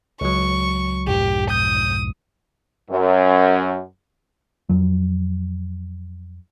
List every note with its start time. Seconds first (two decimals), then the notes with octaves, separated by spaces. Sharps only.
0.21 C#2 F#3 C#6
1.07 B1 F2 G#2 G4
1.50 D#6 G6
2.91 F#2
4.69 F2 F#3